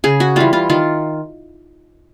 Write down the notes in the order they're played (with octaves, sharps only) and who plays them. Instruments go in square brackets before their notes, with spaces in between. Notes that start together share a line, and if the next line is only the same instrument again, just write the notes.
[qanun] C#3 G#4
F#4
E3 G3 F4
F4
D#3 F4